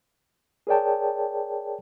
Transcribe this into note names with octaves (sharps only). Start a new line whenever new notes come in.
G#4 A#4 C#5 D5 G5 A5